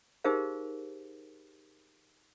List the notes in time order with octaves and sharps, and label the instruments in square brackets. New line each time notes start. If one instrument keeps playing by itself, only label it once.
[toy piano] D#4 G4 G#4 A#4 C5 F5